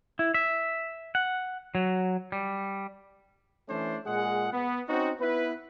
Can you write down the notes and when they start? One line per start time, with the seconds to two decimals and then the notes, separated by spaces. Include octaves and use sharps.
0.19 E4
0.34 E5
1.15 F#5
1.75 F#3
2.32 G3
3.69 E3 A3 C#4 D4 C5
4.06 A#2 G#3 G#4 F#5
4.53 B3
4.89 C4 C#4 D#4 F#4
5.20 B3 E4 B4